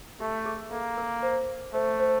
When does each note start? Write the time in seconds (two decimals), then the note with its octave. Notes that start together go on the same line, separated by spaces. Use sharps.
0.20 A3 G4
0.46 G#4
0.72 A#3 A4
0.97 A#4
1.23 C5
1.74 A3 C5
2.00 C5